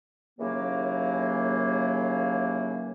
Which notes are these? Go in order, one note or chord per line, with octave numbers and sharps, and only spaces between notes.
D#2 C#3 E3 F#3 A#3